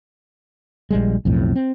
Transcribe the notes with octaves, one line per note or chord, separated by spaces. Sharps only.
A#1 G3 G#3
B1 F2 A2
C4